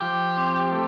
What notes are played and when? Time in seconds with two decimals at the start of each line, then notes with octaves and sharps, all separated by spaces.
0.01 F3 G4
0.37 C4
0.72 A3